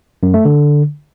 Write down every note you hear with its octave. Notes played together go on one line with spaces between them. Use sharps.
F#2
A3
D3